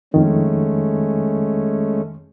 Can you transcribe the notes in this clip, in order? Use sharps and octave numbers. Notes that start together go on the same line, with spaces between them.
F2 D#3 G#3 A3 C#4